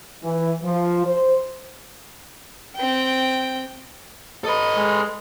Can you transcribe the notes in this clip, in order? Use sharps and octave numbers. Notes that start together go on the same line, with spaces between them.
E3
F3
C5
C4 G5
A4 B4 D#5
G#3